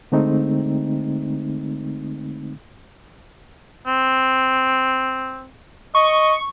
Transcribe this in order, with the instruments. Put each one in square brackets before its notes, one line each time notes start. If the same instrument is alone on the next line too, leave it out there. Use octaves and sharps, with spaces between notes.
[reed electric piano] D3 G#3 A3 C4 D#4
[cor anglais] C4
[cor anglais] D#5 [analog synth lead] C#6